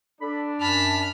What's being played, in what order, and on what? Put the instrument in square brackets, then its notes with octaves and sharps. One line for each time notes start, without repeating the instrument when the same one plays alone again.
[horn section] D4 [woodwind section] A4 B5
[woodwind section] F#2 [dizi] A5 [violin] B5 F6